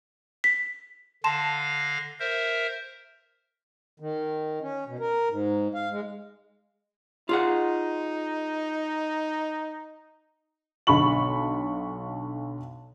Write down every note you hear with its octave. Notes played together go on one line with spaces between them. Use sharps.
B6
D3 F5 A5 C6 A#6 E7
A#4 C5 E5
D#3
C#4
B2
A#4
G#2
F5
G#3
D#4 F4 G#4 F#5
B1 D3 B5 C#6 F#7